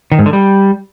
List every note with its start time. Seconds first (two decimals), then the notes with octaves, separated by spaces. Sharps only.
0.12 D#3
0.19 G#2
0.26 D3
0.33 G3